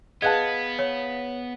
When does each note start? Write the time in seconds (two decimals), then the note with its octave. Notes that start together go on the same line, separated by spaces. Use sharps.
0.22 B3 G#4 B4 D#5 F5 A5 F#6 G#6
0.79 C#5